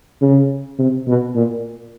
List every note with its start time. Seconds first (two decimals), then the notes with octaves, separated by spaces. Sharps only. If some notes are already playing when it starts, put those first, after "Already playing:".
0.21 C#3
0.78 C3
1.07 B2
1.35 A#2